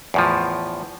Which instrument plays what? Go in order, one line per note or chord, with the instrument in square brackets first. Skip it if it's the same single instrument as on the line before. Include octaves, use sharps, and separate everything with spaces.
[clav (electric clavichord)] E2 A2 F3